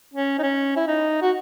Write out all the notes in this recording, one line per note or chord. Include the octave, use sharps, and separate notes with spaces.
C#4
D#4
C#4
E4
D#4
F#4